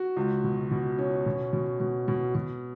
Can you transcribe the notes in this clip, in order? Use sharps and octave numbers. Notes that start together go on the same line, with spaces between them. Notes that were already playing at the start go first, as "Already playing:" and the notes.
Already playing: F#4
C#2
B2
B2
C#4
B2
B2
B2
B2
B2